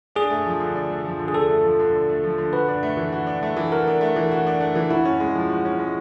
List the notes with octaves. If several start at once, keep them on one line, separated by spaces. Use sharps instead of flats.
D4 G#4
A3
F3
D3
D4
A3
F3
D3
G#4
D4 A4
A3
F3
D3
D4
A3
F3
D3
F#4 B4
D4
A3
E3
F#4
D4
A3
E3
F#4 A#4
D4
A3
E3
F#4
D4
A3
E3
E4 F#4
C#4
G#3
F3
F#4
C#4
G#3